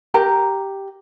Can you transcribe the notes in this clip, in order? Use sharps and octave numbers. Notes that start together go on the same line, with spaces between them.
G4 A#4 A#5